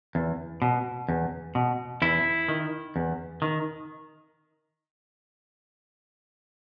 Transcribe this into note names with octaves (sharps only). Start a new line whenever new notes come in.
E2
B2
E2
B2
E2 E4
D#3
E2
D#3